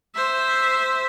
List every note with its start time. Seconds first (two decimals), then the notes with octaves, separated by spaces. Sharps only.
0.15 C5 E5